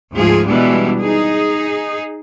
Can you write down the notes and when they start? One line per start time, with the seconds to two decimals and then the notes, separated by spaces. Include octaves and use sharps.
0.14 D2 G#2 F3 F4 G#4
0.46 B2 E3 G3 G#3 D4
1.00 D#4 G#4